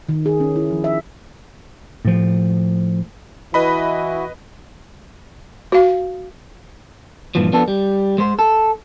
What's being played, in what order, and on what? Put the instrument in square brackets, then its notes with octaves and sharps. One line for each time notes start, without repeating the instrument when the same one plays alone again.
[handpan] D#3
G#4
C#4
E4
F3
E5
[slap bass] A2 F3
[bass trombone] E3 [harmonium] E4 F#4 [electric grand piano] B4 D#5 B5
[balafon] F#4 F5
[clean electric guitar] G2 A#2 E3 F3
F3 B3 D4 A4
G3
G#3 C5
A4